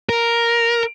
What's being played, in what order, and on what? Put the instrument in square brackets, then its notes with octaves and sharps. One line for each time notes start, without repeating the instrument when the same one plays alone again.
[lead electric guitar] A#4